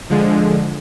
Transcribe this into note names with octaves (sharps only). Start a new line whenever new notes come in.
D3 F3 G#3